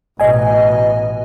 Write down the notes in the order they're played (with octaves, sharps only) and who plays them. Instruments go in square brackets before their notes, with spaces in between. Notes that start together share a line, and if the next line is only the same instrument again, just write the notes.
[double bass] A1 B2 [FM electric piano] D#5 G#5